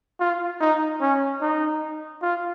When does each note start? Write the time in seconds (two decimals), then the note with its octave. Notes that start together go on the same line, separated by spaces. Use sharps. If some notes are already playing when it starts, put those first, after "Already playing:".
0.20 F4
0.61 D#4
1.01 C#4
1.41 D#4
2.22 F4